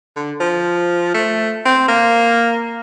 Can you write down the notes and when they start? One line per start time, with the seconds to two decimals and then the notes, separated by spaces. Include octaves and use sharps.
0.16 D3
0.40 F3
1.14 A3
1.65 C4
1.88 A#3